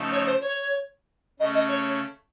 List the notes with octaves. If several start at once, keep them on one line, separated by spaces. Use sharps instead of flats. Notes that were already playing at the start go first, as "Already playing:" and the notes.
Already playing: C#3 F3 A3 D#4 A4
C#5
C5
C#5
C#3 A3 C#4 D#5
D#5
C#5